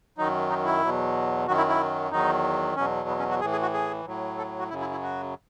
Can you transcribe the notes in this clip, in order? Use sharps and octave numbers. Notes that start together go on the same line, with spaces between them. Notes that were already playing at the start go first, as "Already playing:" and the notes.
F#2 D#3 F#3 D#4
D#4
E4
E2 B2 F#3
F#2 D#3 F#3 F#4
E4
E4
E2 D#3 F#3 D#4
E2 B2 F#3 C#4
B3
C#4
F#4
A2 E3 G#4
G#4
F#4
G#4
A2 F#3
A4
F#4
F#2 C#3 F#3 E4
E4
E4
F#4